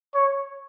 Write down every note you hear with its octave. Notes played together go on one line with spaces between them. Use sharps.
C#5